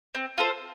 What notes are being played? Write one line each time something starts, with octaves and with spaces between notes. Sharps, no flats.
C4
F4 A4 C5